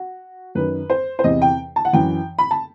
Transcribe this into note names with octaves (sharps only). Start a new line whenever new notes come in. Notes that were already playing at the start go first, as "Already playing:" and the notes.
Already playing: F#4
F#2 D#3 B4
C5
C5
E2 C3 E3 D#5
G5
A5
F#5
F#2 E3 G5
B5
A5